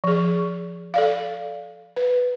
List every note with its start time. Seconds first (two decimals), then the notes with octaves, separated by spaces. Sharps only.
0.04 F3 G#4
0.94 A4 D5 F5
1.96 B4